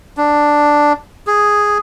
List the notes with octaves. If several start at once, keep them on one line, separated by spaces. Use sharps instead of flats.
D4
G#4